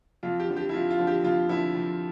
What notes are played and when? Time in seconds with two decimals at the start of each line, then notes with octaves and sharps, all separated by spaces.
0.23 F2 F4
0.40 G4
0.49 D3 F3
0.57 G4
0.69 E4
0.74 F2 F4
0.90 F4
0.99 D3 F3
1.07 G4
1.24 F2 F4
1.49 D3 F3 E4
1.75 F2